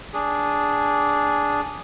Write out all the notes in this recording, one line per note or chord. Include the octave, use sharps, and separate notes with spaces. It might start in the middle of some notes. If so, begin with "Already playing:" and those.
D4 G#4